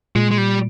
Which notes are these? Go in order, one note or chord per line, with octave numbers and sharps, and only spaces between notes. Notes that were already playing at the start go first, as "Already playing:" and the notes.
A#2 G#3
G#3
G3